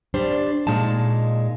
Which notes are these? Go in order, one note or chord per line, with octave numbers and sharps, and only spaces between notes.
G3 D4 C5
A#2 G#3 D#4 A5